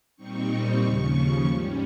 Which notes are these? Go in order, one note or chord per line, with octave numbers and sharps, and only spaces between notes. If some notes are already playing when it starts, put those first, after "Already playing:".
A#2 G3 C4 D#4 C#6
C#6
D#2 C#3 F3 C#6
G#2 G3 C#4